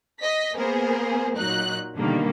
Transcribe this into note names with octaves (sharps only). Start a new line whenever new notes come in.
D#5 B6
A#3 B3 G#4 A#4 C5
A#2 F#3 D#4 F#6
B2 D3 D#3 G3 A#3